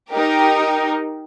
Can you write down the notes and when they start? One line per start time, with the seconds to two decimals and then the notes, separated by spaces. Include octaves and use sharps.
0.11 D#4 G4 A#4